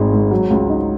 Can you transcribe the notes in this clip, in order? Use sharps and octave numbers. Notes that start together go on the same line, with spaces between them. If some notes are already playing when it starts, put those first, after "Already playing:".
Already playing: G#1 D#3 G#3
G#2
F#3
C#2
D#4